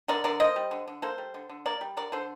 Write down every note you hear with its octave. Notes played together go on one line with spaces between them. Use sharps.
D3 A#4 D5
D3 A#4 D5
A#3 C5 D#5
G3
D3
D3
A#3 A4 C5
G3
D3
D3
A#3 A#4 D5
G3
D3 A#4 D5
D3 A4 C5